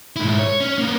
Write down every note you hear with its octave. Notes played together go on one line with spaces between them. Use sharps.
G#2 E4
C#5
C#4
A#3 B3